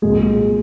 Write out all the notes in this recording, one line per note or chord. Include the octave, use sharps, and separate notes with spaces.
C2 A#2 F#3 G#3 G#4